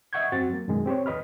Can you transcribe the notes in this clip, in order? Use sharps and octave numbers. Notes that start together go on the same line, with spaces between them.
D#5 E5 F#5 C#6 G6 G#6
F#2 C4 F#4 A6
F#3 A#3
F#2 B2 D#3 G#3
C4 G4 C5 C#5
D#2 B4 D#5 B5 F6